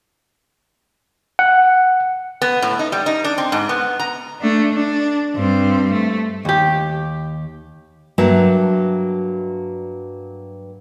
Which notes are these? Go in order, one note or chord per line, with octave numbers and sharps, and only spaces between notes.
F#5
B3
A2
D#4
G3
D#4
D4
C4
G#2
B3
A#5
A3 D4
D4
G2 C4
A3
D#2 G4
G2 F#3 A#3 E5 A5